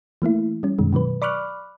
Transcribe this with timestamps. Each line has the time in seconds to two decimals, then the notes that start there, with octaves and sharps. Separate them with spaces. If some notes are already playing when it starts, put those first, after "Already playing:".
0.22 E3 A3 A#3 E4
0.63 G3 C#4
0.79 F#2 B2 D#3 G#3
0.93 B2 D#3 F#3 B4
1.22 D5 B5 C#6 D6 F6 F#6